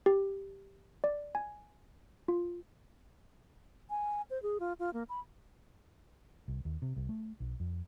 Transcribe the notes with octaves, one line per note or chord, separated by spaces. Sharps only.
G4
D5
G#5
F4
G#5
C5
G#4
F4
F4
A#3
B5
C2
D#2
C3
C2
A3
B1
F2